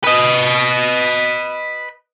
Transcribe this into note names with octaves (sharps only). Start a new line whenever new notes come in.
B4 D#5